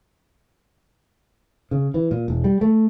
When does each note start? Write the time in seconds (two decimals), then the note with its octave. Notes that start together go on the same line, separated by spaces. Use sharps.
1.71 C#3
1.94 E3
2.11 A#2
2.28 E1
2.44 G3
2.61 A3